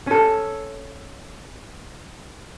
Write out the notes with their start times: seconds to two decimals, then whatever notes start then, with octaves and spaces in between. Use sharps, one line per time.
0.07 C#4 A4